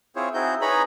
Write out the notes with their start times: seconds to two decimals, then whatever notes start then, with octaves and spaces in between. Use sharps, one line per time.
0.16 C4 E4 F4 G#4 C5 C#5
0.34 C4 D#4 E4 F#4 G#4 G6
0.62 D#4 G#4 B4 C#5 A#5 B5